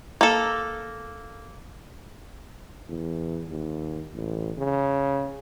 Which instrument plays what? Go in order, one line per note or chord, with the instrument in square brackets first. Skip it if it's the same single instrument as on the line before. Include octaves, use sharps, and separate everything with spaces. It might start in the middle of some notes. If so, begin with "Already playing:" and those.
[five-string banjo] A#3 A4
[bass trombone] E2
D#2
A1
C#3